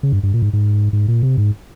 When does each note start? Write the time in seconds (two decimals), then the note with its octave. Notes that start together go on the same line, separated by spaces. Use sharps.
0.03 C#3
0.12 G2
0.23 G2
0.34 A#2
0.42 G#2
0.53 G#2
0.93 G#2
1.08 A#2
1.23 C3
1.38 G#2